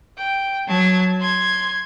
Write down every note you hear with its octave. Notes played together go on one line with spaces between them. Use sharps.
G5
F#3 A5 G#6
C6 G#6